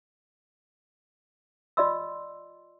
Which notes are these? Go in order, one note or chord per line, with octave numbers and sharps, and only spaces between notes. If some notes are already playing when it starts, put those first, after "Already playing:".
F4 D5 D#5 C6 E6